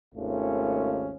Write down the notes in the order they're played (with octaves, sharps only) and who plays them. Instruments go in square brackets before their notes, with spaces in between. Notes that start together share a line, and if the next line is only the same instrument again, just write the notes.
[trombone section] G#1 D#2 A3 C#4 F4